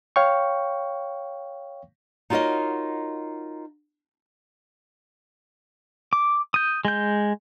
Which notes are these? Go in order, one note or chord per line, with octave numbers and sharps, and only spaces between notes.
C#5 F5 G5 C#6
D#4 F4 F#4 A#4 C#5 D#5
D6
D#6 G6
G#3 G6